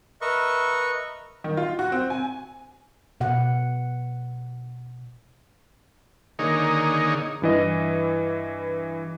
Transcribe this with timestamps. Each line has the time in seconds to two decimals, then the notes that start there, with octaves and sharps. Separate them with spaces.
0.21 A#4 B4 D#5 E5 C#6
1.44 D#3
1.57 F4
1.79 F#4
1.92 C4
2.10 G#5
3.21 B2 F#5
6.39 D3 D#3 A#3 D#4 G#4 C#5
7.42 G2 E3 D#5